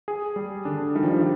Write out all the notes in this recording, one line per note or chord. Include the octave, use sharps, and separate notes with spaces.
G#4
G3
D3 D4
D#3 G3
F3
D#3
D#3